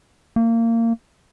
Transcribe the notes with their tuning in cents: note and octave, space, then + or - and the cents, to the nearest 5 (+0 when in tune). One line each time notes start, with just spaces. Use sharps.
A#3 -25